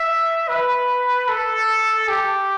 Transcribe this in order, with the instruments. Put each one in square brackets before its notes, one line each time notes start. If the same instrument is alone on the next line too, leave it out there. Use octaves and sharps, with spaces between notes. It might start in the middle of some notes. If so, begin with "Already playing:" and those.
Already playing: [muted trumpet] E5
B4
A4
G4